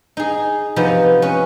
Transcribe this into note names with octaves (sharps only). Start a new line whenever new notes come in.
D#4 G#4
C3 F3 B3 D#4
C#4 B4